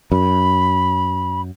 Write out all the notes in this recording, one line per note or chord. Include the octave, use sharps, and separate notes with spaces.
F#2 B5